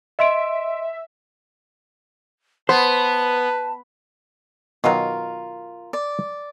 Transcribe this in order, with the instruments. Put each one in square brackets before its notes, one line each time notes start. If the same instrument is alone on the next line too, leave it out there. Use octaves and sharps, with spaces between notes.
[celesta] D#5 C6 D7 [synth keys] E5
[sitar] B3 [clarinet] B4 [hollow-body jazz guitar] C5 [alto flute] A5
[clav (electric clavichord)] B2 D#3 F#3 [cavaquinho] F4 A#4
[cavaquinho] D5